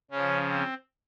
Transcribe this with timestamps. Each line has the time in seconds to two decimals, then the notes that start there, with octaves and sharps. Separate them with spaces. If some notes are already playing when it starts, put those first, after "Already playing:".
0.11 C#3 F3 C#4
0.48 C4